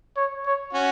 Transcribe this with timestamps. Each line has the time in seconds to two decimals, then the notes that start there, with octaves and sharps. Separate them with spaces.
0.17 C#5
0.46 C#5
0.73 C#4 F#4